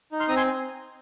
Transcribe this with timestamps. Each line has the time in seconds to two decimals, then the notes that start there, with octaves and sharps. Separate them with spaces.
0.12 D#4
0.20 C6 F6
0.28 C4 A#5 D#6
0.36 G#5 C6